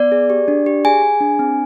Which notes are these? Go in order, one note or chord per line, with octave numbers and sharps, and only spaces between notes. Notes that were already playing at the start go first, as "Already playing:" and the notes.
Already playing: B3 D5
G#4
G4
D4
G4
G#4 G#5
G#4
D4
C4